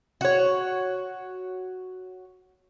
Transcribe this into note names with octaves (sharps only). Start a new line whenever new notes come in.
F#4 C#5